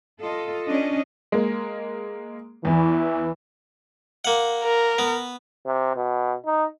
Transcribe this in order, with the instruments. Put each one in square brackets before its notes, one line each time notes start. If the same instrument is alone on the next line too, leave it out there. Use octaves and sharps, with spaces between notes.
[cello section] F4 A4 D#5
C#4 D4 D#5
[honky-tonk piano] G#3 A#3
[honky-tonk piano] E2 [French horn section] E3
[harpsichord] A#3 F#5
[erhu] A#4
[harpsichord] B3
[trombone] C3
B2
D#4